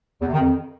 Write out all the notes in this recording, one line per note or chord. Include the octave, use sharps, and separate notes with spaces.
E2
C3
D#3
F2